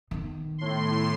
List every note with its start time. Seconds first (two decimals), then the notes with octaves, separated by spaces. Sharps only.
0.11 D#3 B3
0.58 A2 C6